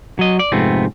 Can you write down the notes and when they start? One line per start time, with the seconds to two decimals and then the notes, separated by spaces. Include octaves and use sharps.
0.19 F#3 D#5
0.39 D5
0.52 F2 G#2 C3 A3 B3 C4